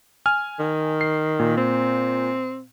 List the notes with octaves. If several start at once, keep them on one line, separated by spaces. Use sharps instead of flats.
G#5 F6
D#3
C7
A#2
C4